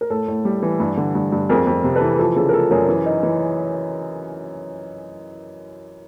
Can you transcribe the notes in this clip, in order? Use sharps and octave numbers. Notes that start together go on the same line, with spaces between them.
A#4
A2 A4
A2
G3
E3
G2
D3
G2
G2
F2 G#4 A#4
F2
C3
A4 B4
E3
F3 A4
C#3 A4
A#4
F3 A4
F#2 G#4 A#4
E3
D#4
E3